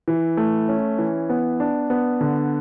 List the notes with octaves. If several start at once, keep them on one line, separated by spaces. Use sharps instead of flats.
E3
A3
C#4
E3
B3
D4
B3
D3